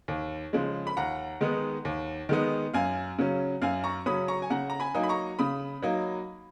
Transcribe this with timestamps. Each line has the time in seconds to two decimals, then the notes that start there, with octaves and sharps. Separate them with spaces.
0.08 D#2
0.53 C#3 F3 G#3
0.87 B5
0.97 D#2 F#5 A#5
1.41 D#3 G#3 B3 D#4
1.85 D#2
2.29 D#3 G#3 B3 D#4
2.74 F#2 F5 G#5
3.19 C#3 F#3 C#4
3.62 F#2 F5 G#5
3.84 A#5 C#6
4.06 C#3 F#3 C#4 B5 D#6
4.28 A#5 C#6
4.42 G#5
4.50 C#3 F#5 A#5
4.70 A#5
4.80 G#5 B5
4.94 F#3 A#3 D#4
5.03 B5
5.09 A#5 C#6
5.39 C#3 B5 D#6
5.82 F#3 A#3 D#4